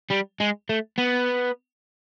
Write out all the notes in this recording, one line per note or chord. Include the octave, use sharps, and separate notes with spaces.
G3
G#3
A3
B3